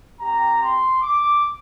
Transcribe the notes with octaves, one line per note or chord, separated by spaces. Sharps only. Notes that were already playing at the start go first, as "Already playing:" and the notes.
C4 G4 A#5
C6
D6